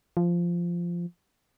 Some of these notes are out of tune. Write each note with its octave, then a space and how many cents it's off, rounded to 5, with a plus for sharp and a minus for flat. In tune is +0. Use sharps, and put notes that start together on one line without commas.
F3 -10